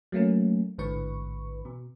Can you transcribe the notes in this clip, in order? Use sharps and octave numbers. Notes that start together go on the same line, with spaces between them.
F#3 A3 A#3 C#4
A1 G#2 D3 E3 B4 C#6
B2